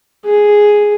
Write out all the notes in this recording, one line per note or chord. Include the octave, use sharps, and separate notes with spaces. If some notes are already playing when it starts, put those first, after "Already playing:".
G#4